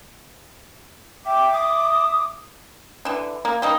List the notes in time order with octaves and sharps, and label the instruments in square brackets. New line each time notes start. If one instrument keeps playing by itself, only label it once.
[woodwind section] E5 D6 [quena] G5
[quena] D#6
[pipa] D3 E3
A#3
G3 A#3 D#4